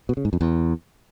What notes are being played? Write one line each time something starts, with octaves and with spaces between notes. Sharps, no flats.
B2
C#3
G#2
F2
E2